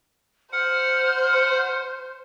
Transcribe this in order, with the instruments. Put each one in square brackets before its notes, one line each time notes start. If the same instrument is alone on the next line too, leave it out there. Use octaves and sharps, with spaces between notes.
[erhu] C5 [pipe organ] F#5 [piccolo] F6